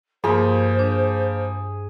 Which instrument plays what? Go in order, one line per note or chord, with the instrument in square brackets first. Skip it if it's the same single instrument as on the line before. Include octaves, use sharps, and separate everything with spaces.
[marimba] G2 C6 [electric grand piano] F3 A#3 [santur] G#4 B5 [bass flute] C5
[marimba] D4